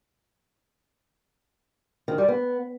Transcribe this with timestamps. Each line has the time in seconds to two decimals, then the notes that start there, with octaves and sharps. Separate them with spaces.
2.08 D#3
2.18 G3
2.28 B3